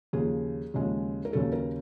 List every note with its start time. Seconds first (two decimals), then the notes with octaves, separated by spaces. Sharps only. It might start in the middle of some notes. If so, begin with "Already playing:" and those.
0.13 D#2 C#3 F3 G#4
0.74 D#2 C#3 F3 G#3
1.25 A#4
1.33 D#2 C#3 F#3 A4
1.53 A#4